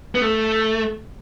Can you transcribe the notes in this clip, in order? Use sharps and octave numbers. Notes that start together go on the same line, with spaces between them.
B3
A3